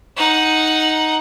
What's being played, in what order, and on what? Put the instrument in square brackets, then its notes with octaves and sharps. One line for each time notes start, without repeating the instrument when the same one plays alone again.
[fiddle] D#4 F#5